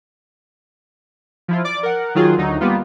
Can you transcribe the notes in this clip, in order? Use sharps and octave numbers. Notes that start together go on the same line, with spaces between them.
F3 E4 F4
D5 D6
A#4 F#5
D#3 F#3 F4 G#4
D2 F#3 D#4
G3 A#3 B3 F4